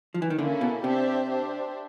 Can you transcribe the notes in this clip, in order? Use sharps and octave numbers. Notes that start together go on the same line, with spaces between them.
F3
E3
D#3
D3 A#3 C#4 E4 A4
B2
C3 D4 G4 C5 E5
D4 G4 C5 E5